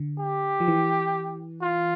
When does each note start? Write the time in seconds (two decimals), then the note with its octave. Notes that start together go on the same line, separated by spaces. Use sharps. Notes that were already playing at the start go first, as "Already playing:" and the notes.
Already playing: D3
0.20 G4
0.60 F3
0.68 E3
1.62 F4